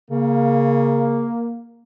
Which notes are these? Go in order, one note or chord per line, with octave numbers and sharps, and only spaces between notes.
C#3 A#3